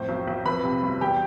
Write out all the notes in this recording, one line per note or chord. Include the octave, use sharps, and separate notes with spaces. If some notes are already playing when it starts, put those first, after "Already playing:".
Already playing: F2 A2 C5
B1
B1
F2 B4 B5
C3
G1
E2 G4 G5